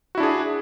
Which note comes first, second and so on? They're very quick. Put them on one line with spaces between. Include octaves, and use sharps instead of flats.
F#4 E4 D4 G#4